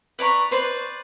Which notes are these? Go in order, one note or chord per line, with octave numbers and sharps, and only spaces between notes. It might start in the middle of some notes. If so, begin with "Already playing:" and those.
B4 D5 A#5 C#6
B4 C5 D5